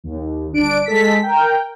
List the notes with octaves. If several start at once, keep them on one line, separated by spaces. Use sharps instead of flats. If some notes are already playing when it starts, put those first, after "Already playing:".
D#2
G1 D4 D7
G#3 A4 B6
A#4 G5